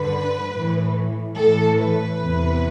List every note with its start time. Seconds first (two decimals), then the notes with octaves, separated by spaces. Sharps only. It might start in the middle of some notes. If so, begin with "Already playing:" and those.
Already playing: G2 D3 B4
0.52 A2 E3
1.36 A2 E3 A4
1.77 B4
2.19 E2 C3 E3